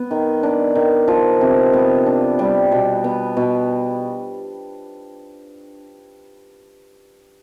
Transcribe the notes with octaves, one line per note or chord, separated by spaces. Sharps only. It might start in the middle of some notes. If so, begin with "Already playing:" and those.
Already playing: B3
D#3
D4
D#3
F3
C3
B3
D4
G3
B2
B3
B2